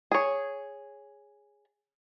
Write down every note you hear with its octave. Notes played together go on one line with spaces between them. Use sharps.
G#4 C#5